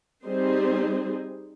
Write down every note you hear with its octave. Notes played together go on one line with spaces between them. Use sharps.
G3 C4 D#4 G#4 C5